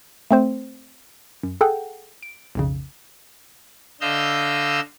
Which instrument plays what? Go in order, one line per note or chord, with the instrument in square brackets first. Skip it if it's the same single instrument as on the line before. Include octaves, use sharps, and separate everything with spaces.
[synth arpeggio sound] A3 C4 C5
F#2
G#4 A4 F#5 G5
D7
B1 F2 C#3
[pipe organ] D3 D#5 F5 E6 G6